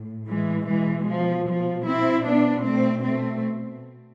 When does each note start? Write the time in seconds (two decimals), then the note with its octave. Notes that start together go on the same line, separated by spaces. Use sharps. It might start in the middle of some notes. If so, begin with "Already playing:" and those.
Already playing: A2
0.27 E3 G#3
0.67 B2 E3 G#3
1.08 F3
1.46 F3
1.87 C4 E4
2.25 B2 B3 D4
2.65 A3 C4
3.04 A3 C4